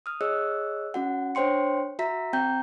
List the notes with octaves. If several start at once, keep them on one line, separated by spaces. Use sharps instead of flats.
D#6 F6
G#4 C#5 D#5 E6 F#6
C#4 F#4 F#5
D4 C5 C#5 G5 C6 C#7
F#4 E5 A#5 B6
C4 G5 A#5 G6